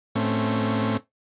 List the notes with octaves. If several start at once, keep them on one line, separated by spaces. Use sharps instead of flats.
A2 A3 C4 C#4